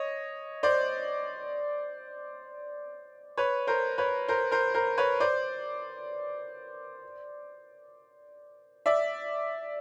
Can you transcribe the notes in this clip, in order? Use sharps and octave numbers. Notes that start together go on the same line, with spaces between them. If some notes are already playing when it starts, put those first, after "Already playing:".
Already playing: C#5 D#5
C5 D5
B4 C#5
A#4 C5
B4 C#5
A#4 C5
A#4 C5
A#4 C5
B4 C#5
C5 D5
D5 E5